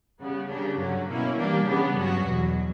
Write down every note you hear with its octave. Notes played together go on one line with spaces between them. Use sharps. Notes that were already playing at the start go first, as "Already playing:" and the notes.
C#3 G3 B3
C#3 G3 A#3 D4
G2 D3 F#3 C#4
B2 A#3 C#4 E4
E3 G3 A#3 D4 G4
C#3 G3 B3 D4
G2 F#3 C#4 F#4
E2 B2 F#3